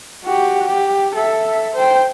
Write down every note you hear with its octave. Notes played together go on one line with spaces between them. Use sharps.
F#4 G4
G4
A4 E5
C5 G5